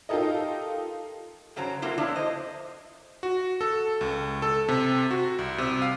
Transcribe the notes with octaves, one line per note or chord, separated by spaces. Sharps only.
D#4 F4 G4 A4 A#4 D#5
G2 C#3 F#3 C5 A#5
A3 A#3 C4 F4 F#4
D3 F3 B3 D4 E4 C#5
C5 D#5
F#4
A4
C#2
A4
C3
F#4
C2
C3
F5